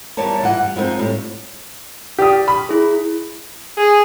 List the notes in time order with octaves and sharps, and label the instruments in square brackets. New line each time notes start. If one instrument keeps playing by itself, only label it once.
[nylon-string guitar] E2 G3 A#3 D#4 C#5 A5
G2 E3 D#5 F#5
G3
F3 G#3 B3 C4 D#4
A2 G3
[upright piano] G4 D5 D#6
B5
[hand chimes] E4 G#4
[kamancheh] G#4